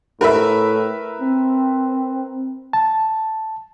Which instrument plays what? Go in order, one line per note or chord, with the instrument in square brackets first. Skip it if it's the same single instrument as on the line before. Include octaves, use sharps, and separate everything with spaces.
[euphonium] A2 [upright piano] A#4 B4 E5
[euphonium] C4
[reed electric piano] A5